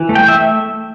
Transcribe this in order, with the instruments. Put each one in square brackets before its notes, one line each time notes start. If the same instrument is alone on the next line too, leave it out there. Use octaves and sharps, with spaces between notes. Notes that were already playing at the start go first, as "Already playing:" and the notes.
Already playing: [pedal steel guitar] E3
A3
G5
E5